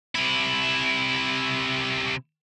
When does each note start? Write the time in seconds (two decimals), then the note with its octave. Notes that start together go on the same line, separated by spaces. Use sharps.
0.15 C3 E4